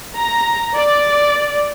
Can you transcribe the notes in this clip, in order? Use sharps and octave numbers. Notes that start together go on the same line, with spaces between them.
A#5
D5